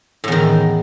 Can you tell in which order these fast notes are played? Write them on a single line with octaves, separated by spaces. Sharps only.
A2 E2 D#3